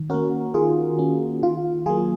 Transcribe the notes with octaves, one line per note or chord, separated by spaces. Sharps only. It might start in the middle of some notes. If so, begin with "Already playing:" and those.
Already playing: D#3
A#3 C#4 F#4 A#4
D#3 F4 G#4
A#3 C#4
D#3 F4
F#3 A#3 F4 G#4